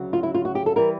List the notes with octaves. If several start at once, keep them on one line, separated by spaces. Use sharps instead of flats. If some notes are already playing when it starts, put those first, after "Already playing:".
Already playing: D2 C#3 F#3
F4
E4
F4
F#4
G4
A4
E3 G3 A#4